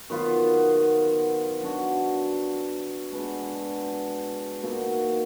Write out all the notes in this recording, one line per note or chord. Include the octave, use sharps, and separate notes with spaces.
D#3 F#3 B3 F4
F#3 D4 F#4
B2 G#3 B3 D4
B2 A#3 D#4 F#4